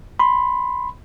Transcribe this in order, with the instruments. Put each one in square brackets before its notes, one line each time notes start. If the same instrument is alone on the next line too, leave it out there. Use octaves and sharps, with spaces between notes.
[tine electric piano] B5 C6